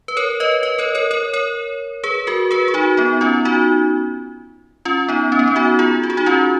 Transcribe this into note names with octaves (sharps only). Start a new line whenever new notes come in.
B4
A#4 C#5
B4 D#5
B4 D#5
A#4 C#5
A#4 C#5
A#4 C#5
A#4 C#5
G#4 B4
F#4 A#4
G#4 B4
G#4
D#4 F#4
B3 D#4
C#4 F4
D#4 F#4
C#4 F4
B3 D#4
C#4
B3
C#4
D#4 F#4
F4 G#4
F#4
G#4
D#4 F#4
C#4 F4